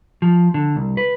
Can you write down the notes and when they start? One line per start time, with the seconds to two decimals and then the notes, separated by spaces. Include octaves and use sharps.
0.22 F3
0.54 D3
0.76 C2
0.97 B4